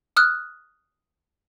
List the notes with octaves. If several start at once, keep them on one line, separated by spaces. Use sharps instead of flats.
D#6 F6 F#6